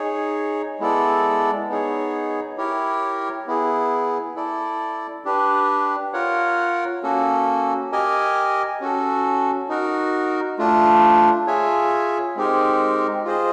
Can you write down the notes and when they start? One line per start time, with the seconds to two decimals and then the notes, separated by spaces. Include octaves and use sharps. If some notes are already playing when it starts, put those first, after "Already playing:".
Already playing: D#4 G#4 C#5
0.80 G#3 B3 E4 A4 D5
1.69 B3 D#4 G#4 C#5
2.57 E4 G4 A#4 C#5
3.47 B3 E4 G#4
4.35 E4 A4 D5
5.25 D4 G4 B4
6.13 F4 A#4 C#5 F#5
7.03 A#3 C#4 F#4 A4
7.92 G4 A#4 D#5 G#5
8.81 C#4 F#4 A4
9.69 D#4 F#4 A#4
10.59 A3 D4 F4
11.47 F4 G#4 C#5 E5 G#5
12.36 G#3 C4 D#4 G4 A#4
13.25 F4 G#4 C5 D#5